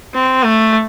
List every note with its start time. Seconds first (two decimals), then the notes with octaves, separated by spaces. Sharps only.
0.14 C4
0.43 A3